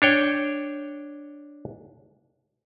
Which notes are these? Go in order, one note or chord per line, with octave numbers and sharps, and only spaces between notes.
D4 C#5 G5